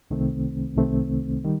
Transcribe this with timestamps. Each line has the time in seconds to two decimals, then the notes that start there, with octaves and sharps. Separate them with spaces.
0.11 C2 C3 D#3 A3 C4
0.77 C2 C3 D#3 A3 C4
1.44 D#3 G3